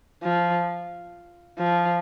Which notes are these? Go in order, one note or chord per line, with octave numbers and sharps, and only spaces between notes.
F3
F3